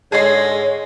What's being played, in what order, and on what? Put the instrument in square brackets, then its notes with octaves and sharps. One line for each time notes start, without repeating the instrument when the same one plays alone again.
[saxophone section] G#2 D3 G#3 [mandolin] G#4 C6 [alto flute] C#5